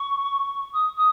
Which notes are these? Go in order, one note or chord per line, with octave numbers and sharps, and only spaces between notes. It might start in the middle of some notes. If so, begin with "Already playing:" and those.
Already playing: C#6
D#6
D#6